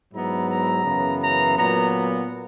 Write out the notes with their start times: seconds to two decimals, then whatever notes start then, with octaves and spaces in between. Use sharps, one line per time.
0.14 G#2 F#3 B3 E4 A#5
0.50 A#5
0.85 F#2 C#3 E3 B3
1.22 A#5
1.57 A#2 F#3 B3 A#5